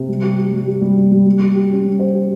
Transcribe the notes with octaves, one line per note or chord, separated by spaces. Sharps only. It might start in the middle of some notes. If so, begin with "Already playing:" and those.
Already playing: C3
G3
G4
G4
G3
G4
G3
G3
G3
G3
G4
G4
C#4
G3
C5
G4